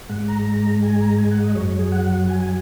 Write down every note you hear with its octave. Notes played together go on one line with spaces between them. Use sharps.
G#2 G#3 F#5
A#5
A#5
G#5
A#5
G#5
F#5
D#5
F#2 F#3 C#5
G#4
F#5
G#5
G#5